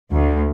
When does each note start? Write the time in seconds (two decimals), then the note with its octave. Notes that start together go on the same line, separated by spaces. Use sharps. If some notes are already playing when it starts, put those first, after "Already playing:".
0.12 D2